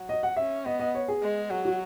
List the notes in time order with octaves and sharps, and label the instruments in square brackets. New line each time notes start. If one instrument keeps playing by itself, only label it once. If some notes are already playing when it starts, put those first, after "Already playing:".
Already playing: [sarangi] F#3
[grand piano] D#5
F#5
[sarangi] C#4 [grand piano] E5
[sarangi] B3 [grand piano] D#5
[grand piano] D#5
C#5
G#4
[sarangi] G#3
[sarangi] F#3 [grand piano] G#4
[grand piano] F#4